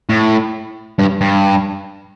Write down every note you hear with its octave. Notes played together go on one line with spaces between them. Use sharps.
A2
G2
G2